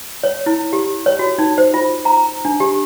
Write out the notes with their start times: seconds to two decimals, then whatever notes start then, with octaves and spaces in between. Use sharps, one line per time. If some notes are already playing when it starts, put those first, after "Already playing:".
0.23 C#5
0.46 E4
0.73 G4
1.06 C#5
1.19 F#4
1.38 D#4
1.58 C5
1.74 F4
2.05 A#5
2.45 D4
2.60 G4